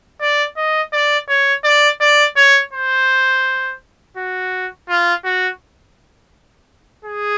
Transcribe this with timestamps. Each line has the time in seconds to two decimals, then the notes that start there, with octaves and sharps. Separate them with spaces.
0.21 D5
0.57 D#5
0.93 D5
1.29 C#5
1.64 D5
2.01 D5
2.37 C#5
2.73 C5
4.17 F#4
4.89 F4
5.24 F#4
7.05 G#4